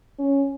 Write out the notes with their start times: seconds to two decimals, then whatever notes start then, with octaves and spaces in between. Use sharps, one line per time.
0.19 C#4